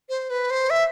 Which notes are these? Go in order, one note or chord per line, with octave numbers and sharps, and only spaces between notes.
C5
B4
C5
E5